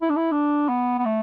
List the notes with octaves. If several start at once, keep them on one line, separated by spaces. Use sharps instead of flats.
E4
D4
E4
D4
B3
B3
A3